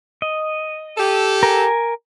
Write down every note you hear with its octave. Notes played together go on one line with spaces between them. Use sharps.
D#5
G4 A4
A#4 G#5